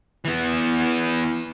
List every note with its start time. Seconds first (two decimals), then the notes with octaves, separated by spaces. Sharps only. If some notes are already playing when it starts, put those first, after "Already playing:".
0.25 E3 B3